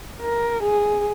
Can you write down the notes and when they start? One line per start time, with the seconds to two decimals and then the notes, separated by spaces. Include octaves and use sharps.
0.22 A#4
0.62 G#4